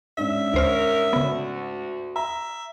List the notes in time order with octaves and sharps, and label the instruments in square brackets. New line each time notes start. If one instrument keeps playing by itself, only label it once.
[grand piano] G#2 C#4 D4 [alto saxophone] E5
[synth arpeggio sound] D2 C5 F6 [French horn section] A#4 C#5
[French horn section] D2 F#4 [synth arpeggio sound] C#3 B3
[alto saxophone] E5 [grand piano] A#5 E6